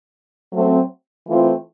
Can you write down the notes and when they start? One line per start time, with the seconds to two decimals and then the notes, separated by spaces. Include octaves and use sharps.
0.53 F#3 A3 C4
1.27 E3 A3 C4 F4